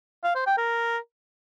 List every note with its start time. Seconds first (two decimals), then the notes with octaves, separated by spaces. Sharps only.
0.24 F5
0.35 C5
0.46 G5
0.58 A#4